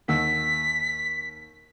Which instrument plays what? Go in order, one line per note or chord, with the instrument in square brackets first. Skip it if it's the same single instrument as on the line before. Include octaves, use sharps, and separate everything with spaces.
[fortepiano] D#2 F#5 E6 [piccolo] B6